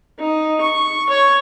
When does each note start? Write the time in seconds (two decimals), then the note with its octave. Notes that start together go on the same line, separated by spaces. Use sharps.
0.20 D#4
0.61 C#6
1.10 C#5